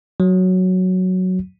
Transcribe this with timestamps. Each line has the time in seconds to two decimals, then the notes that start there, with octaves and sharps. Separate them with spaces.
0.20 F#3